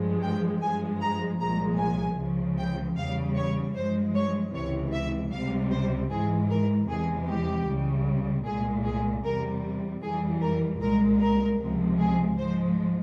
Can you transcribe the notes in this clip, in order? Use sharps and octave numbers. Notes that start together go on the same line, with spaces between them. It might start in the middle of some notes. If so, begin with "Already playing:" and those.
Already playing: G2 F3 G#3
G5
G2 F3 G#3 G#5
A#5
C2 A#2 F3 G#3 A#5
G#5
C#2 C#3 F3
G5
E2 C#3 G3 F5
C#5
G2 F3 G#3 C5
C#5
C#2 C3 E3 C#5
E5
C#2 C3 G3 F5
C5
G#2 E3 G#3 G#4
A#4
E2 C3 E3 G#3 G#4
G4
C#2 C#3 G3
C2 A#2 G#3 G#4
G#4
E2 C3 G3 A#4
F2 E3 G3 G#4
A#4
C2 A#2 G#3 A#4
A#4
C#2 C3 F3 G#3
G#4
G#2 F3 G#3 C5